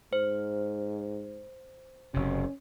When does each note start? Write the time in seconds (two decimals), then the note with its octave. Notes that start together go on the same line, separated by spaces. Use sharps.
0.13 G#2 C5
2.14 F#1 C3 C#4